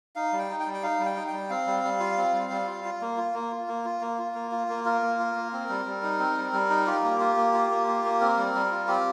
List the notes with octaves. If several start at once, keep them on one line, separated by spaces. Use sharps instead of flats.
D#4 F5
G3
G5
D#4
G5
G3
G5
D#4 F5
G3
G5
D#4
G5
G3
C4 F5
G3
G3
F4
C4
G3
G3
F4
F4
A#3
F4
A#3
F4
A#3
F4
A#3
F4
A#3
F4
A#3
F4 A#4
A#3
F4
A#3
C4
G3
G3
D#4
C4
G3
G3
D#4
F4 G4
A#3
F4
A#3
F4
A#3
F4
A#3
C4 A#4
G3
G3
F4
C4 G4